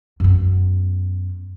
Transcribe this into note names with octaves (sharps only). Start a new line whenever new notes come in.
F#2 B3